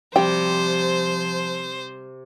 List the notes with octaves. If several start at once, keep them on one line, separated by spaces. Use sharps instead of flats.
C3 F3 G3 C5 G5